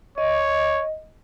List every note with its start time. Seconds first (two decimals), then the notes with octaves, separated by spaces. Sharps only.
0.18 C#5 D#5